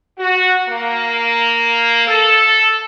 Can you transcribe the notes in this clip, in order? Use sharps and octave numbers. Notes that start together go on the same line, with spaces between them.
F#4
A#3
A4